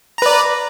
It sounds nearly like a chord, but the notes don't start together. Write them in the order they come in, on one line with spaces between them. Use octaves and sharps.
A#5 B4 D5